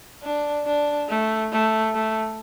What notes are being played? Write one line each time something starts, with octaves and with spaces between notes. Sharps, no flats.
D4
D4
A3
A3
A3